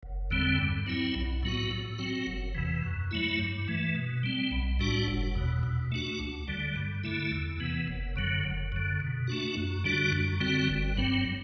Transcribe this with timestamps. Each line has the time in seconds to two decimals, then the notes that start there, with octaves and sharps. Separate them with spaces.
0.03 F#1
0.31 E2 D3 G3 C4
0.58 G2
0.87 F#3 C4 E4
1.15 B1
1.43 A2 F#3 B3 F#4
1.71 A2
1.98 F#3 C4 F#4
2.26 F#1
2.55 E2 C3 E3
2.84 F#2
3.11 F#3 A3 E4
3.39 G2
3.68 E3 A3
3.95 B2
4.23 G3 C4
4.51 B1
4.79 A2 G3 D4 F#4
5.08 F#1
5.35 E2 B2
5.63 B2
5.92 A3 D4 F#4
6.20 D2
6.48 D3 G3
6.76 G2
7.04 D3 A3 E4
7.32 E2
7.60 C3 E3 B3
7.87 F#1
8.16 F#2 D3 F#3
8.44 F#1
8.72 F#2 D3
9.00 B2
9.28 A3 D4 F#4
9.57 F#2
9.84 D3 G3 D4 F#4
10.12 F#2
10.40 D3 G3 C4 F#4
10.69 G1
10.96 G2 F#3 C4